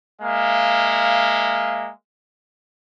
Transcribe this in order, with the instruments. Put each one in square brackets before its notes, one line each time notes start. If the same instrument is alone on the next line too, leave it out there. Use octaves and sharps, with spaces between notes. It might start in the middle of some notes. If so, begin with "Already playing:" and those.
[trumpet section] G#3 A#3 E5 F5